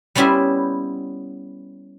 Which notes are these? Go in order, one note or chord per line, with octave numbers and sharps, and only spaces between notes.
G3 B3 C#4 E4 G4 C5